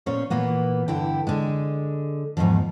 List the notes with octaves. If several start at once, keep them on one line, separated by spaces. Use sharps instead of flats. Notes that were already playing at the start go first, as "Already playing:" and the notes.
A#2 C#4 C5 C#5
A#2 E3 A#3 B3
G2 D3 E4 G5
D3 G#3
E2 G#2 B2 D#3 F3